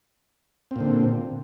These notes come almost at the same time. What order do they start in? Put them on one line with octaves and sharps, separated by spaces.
C4 A#2 D3